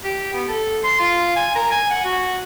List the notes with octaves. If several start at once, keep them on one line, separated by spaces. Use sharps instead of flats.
G4
B3
A4
C6
F4
G#5
A#4
G#5
F#5
F#4